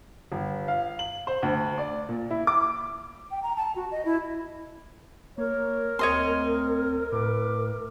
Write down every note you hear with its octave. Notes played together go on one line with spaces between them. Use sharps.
G1
F5
F#7
C5
D2
D5
A#2
E4
D6
G5
A#5
A5
F#4
D#5
E4
A#3 A#4 C#5
D2 C4 C#5 D#5 C6
A2 B4 D6